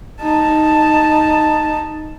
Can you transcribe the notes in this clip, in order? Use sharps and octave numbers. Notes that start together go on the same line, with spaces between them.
D#4 A5